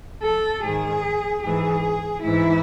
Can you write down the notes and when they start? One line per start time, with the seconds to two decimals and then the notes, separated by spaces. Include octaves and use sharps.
0.22 A4
0.63 G#2 D#3 G#4
1.43 G#2 E3 G#4
2.23 G#2 E3 E4